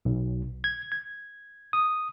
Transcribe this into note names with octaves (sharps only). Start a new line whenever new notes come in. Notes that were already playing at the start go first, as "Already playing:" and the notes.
B1
G#6
G#6
D#6